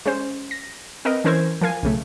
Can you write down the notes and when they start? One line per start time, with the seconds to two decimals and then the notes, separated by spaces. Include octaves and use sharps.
0.06 G#3 C#4 C5
0.51 A#6
1.05 C4 A#4 B4 D#5
1.24 E3 C#4 A#4 C5 E6 G#6
1.61 F3 A#4 F5 G#5
1.83 B1 C#3 A3